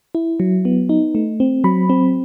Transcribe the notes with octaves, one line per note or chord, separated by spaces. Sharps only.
E4
F#3
B3
D#4
A3
C4
F#3 B5
C4